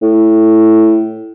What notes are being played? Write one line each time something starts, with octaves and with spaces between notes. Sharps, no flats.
A2